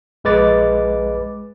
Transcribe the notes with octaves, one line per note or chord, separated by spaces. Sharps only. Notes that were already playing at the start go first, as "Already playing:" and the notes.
A#1 G#3 B4 D6 A6